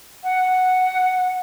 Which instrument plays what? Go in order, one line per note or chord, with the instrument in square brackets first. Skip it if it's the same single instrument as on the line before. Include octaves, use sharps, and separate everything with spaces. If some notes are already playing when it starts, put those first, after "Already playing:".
[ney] F#5